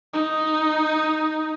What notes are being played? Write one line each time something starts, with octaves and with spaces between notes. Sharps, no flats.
D#4